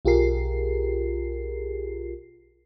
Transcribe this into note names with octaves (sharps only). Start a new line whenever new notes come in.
B1 F4 G4 G#4 A#4 C7